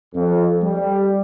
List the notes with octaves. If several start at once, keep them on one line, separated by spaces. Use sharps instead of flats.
F2
G3